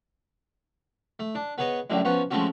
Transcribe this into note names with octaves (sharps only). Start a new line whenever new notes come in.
A3
D4
B3 G#4 B4 C#5 D#5
F#2 A2 D3 G3
F3 B3 C#4 F#4
F3 G#3 A3 C4 C#4 F#4